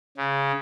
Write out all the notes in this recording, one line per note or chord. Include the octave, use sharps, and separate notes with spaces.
C#3